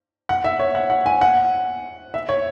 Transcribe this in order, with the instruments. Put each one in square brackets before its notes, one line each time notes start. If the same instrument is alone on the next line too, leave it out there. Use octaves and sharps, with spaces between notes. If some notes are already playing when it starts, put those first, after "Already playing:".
[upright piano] F#5
E5
C#5
F#5
F#5
G#5
F#5
E5
C#5